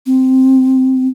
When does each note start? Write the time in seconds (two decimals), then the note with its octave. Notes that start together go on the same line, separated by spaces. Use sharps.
0.06 C4